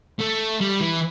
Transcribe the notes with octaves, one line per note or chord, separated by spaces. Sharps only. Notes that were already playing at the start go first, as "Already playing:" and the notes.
A3
G3
E3